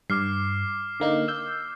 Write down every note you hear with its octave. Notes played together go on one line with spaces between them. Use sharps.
G2 D6 F6 C7
D3 A#3 D#4
E6 G6